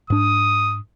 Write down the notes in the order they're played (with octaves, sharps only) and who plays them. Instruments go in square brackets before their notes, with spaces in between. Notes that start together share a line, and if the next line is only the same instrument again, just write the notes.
[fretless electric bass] G#2 D4 [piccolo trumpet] D#6